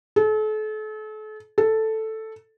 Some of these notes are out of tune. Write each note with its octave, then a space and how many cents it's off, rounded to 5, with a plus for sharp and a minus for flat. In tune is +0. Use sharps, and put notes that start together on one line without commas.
A4 -40
A4 +0